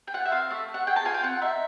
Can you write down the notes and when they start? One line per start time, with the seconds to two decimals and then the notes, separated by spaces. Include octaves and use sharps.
0.08 G5
0.14 F4 F#5
0.25 E5
0.32 C4 F5
0.50 A3 E5
0.68 A3
0.74 F#5
0.87 G#4 G5
0.96 A5
1.05 F4 G#5
1.14 G5
1.23 C4 F#5
1.41 D#4 E5